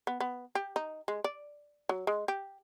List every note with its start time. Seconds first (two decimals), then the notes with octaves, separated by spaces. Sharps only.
0.07 B3
0.20 B3
0.55 G4
0.76 D#4
1.08 G#3
1.24 D5
1.89 F#3
2.07 G#3
2.28 G4